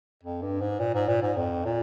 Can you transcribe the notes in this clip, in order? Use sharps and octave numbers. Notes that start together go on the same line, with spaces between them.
F2
G2
G#2
A#2
G#2
A#2
G#2
F2
A#2